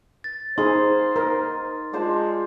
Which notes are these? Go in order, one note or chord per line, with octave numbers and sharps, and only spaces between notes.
A6
D#4 G#4 C5 F5 C6
D#4 A#4
G#3 D4 F4 C5